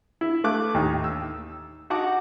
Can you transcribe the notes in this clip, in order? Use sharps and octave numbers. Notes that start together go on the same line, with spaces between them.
E4
A3 F5 D6 F#6
D#2 A2 D#4
E6
D#4 F#4 F#5 A5 D6